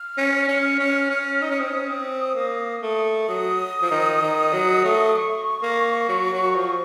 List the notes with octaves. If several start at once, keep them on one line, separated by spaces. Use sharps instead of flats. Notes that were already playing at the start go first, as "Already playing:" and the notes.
Already playing: F6
C#4
C#4
C#4
C#4
D#4 D#6
C#4 F6
C4 D#6
C#4
C4
A#3
A3
F#3 D#6
F3
D#3
D#3
F#3
A3
C#6
A#3
F#3
F#3
F3